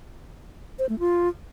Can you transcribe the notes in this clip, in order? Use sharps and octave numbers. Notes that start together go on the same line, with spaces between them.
C5
A3
F4